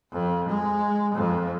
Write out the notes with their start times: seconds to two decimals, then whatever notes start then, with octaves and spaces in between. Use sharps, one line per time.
0.13 F2
0.50 G#3
1.16 F2